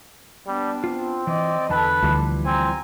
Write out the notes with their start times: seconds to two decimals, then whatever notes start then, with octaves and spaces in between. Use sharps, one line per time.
0.47 G3 B3 D4
0.84 C4 F4
1.27 E3 D5 D#5
1.70 E2 D3 A4 B4 A5
2.03 D2 E3 F3 G3
2.46 C4 G#5 A#5